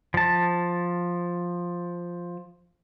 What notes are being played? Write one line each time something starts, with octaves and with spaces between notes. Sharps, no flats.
F3 A5